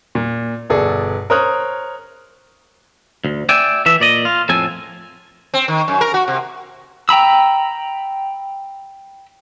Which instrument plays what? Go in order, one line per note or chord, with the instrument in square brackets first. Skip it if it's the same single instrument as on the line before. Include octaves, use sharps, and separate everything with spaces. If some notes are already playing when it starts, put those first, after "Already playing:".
[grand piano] A#2
G1 B2 G#4 A4 D5
A#4 C5 C#5 D#6 F6 F#6
[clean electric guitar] D2
D5 E5 G5 G#5
E3 A4 E5
A#2 D5 D#5
F4
F2 A2 A4 G#5
[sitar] C4
D#3
F#2
A#4
F#4
C3
[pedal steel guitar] G5 A#5 B5 E6